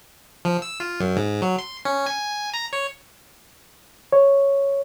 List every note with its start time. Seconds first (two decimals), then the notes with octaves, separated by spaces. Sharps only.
0.45 F3
0.62 E6
0.80 F4
1.00 F#2
1.16 G#2
1.42 F#3
1.59 C6
1.85 C#4
2.06 G#5
2.54 A#5
2.73 C#5
4.12 C#5